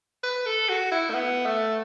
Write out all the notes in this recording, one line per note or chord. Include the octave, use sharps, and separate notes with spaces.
B4
A4
F#4
E4
A3
B3
A3